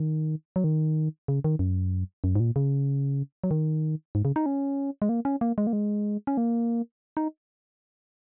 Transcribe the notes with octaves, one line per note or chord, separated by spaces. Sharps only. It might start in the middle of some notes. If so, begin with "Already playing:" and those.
Already playing: D#3
F#3
D#3
C#3
D#3
F#2
F#2
G#2
A#2
C#3
F#3
D#3
G#2
C#3
D#4
C#4
G#3
A#3
C#4
A#3
G#3
A#3
G#3
C#4
A#3
D#4